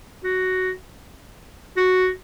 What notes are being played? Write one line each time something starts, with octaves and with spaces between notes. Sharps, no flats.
F#4
F#4